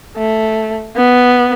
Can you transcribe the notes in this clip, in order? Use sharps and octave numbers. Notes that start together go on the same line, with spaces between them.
A3
B3